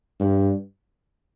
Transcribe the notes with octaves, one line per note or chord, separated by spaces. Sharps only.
G2